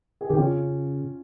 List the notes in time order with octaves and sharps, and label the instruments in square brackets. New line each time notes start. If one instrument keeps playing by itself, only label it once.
[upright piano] G#4
[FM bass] D#3 [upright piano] G4
[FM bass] C#3 [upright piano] C#4 F4